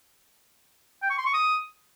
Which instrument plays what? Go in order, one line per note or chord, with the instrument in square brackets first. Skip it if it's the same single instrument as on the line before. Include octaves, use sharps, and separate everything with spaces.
[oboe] G5
C#6
C6
C#6
D#6